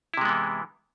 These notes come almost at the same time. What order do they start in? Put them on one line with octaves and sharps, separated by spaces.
E4 C3 G#3 B3 E3